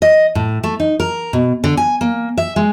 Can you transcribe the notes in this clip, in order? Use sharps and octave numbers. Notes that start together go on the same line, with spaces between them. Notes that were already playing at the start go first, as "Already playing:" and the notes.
D#5
A2
A3
D#4
A#4
B2
D3
G#5
A#3
E5
G#3